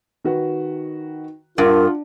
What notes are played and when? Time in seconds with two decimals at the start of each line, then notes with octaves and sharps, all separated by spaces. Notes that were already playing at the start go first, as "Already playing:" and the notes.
0.24 D#3 F#4 B4
1.58 G2 F4 A#4 F#5